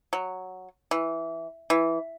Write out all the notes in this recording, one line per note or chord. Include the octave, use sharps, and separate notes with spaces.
F#3
E3
E3